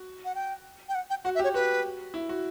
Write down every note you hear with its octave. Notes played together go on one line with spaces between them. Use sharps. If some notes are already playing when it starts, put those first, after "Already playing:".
Already playing: F#4
F#5
G5
G5
F#5
G5
F#4 F#5
E5
G4 C#5
F#4 B4
E4
F#4